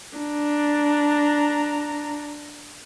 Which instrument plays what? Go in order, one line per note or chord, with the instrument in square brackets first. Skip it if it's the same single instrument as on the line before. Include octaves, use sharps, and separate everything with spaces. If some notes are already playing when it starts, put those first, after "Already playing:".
[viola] D4 A#5